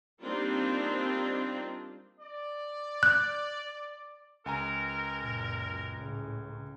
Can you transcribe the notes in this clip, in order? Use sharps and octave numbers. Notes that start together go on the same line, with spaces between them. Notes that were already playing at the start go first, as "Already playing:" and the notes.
G3 A#3 C4 D4 D#4 F4
D5
F#6
C#2 A#4 G#5 A#5
F#2 A#2
A2 C#3